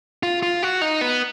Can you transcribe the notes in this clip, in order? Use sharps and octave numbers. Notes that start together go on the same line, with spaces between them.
F4
F4
F#4
D#4
B3